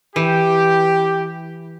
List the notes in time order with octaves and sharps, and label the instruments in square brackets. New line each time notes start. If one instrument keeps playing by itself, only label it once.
[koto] E3 [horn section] G4